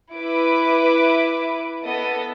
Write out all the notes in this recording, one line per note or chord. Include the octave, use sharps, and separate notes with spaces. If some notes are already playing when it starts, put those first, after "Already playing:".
E4 B4 D6
B3 A4 D#5